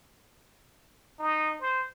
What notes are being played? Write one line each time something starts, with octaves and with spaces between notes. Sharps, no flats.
D#4
C5